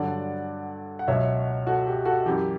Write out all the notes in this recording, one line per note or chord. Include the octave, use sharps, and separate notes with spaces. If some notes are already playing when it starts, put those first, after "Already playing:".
Already playing: G2 D3 F#3 D5 F#5
F#5
C#2 B2 F#3 C#5 E5
F#4 A4
G4
F#4 A4
F#2 E3 G4